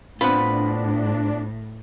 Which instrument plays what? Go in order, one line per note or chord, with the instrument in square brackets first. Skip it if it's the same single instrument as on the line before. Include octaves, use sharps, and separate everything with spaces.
[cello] A2 [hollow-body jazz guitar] B3 C4 F4 [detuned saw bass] D4 [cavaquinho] B5